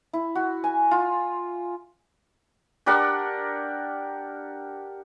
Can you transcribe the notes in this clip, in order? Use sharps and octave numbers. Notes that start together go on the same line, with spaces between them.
E4
F#4
G#5
F4
D4 G4 A#4 F#5